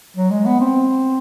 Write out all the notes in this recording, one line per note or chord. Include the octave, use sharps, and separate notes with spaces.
F#3
G#3
B3
C4